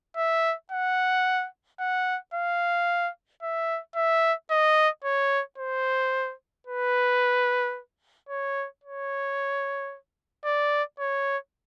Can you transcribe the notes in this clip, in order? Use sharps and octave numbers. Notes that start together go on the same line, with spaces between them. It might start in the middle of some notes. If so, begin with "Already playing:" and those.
E5
F#5
F#5
F5
E5
E5
D#5
C#5
C5
B4
C#5
C#5
D5
C#5